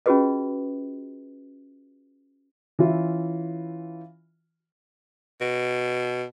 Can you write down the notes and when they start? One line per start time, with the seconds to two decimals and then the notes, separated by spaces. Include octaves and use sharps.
0.06 C#4 F4 F#4 G#4 B4 D#5
2.79 E3 C#4 F4 E5
5.41 B2